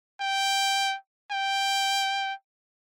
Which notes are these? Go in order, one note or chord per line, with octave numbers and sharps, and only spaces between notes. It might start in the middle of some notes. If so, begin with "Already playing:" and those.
G5
G5